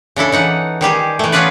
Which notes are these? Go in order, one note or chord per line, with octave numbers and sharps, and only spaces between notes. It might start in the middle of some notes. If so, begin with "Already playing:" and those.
C#3 D4 E4 A4
E3 D#4 F#5
D#3 G3 G4 G#4
E3 A3
B3 C#4 F4 G#4 B4 D5